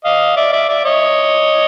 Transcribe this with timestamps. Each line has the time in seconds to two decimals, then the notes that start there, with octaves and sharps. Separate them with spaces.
0.05 D#5 F5
0.36 D5 E5
0.52 D5 E5
0.69 D5 E5
0.85 C#5 D#5